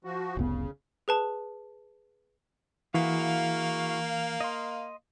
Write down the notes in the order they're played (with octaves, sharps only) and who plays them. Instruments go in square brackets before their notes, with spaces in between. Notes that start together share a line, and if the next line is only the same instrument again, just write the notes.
[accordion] F3 F#4
[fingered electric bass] F1 C2 B3 [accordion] C#3
[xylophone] G#4 B4 A5
[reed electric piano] E3 [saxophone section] A#3 F5 [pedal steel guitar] E4 F#4 G#4
[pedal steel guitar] D#5 C6